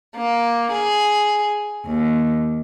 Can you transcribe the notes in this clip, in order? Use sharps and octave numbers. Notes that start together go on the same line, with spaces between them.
A#3
G#4
D#2